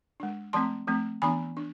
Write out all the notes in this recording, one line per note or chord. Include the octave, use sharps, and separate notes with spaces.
G#3 D4
F3 A3 C4 A5 C6
F3 A3 C4
E3 B3 D4 G#5 B5
D4